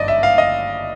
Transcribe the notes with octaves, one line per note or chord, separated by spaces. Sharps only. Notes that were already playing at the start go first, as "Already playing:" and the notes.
Already playing: G#1 G2 D5 D#5
E5
F5
D#5